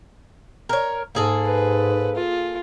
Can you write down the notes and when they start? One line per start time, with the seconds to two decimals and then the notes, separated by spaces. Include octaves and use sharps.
0.69 A#4 C#5
1.15 G#2 A#3 G#4 A4
1.45 B4
2.15 F4